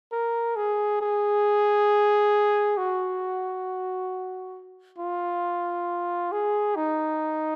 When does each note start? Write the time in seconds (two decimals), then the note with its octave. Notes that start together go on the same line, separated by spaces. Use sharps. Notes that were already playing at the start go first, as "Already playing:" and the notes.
0.12 A#4
0.56 G#4
1.01 G#4
2.77 F#4
4.98 F4
6.32 G#4
6.76 D#4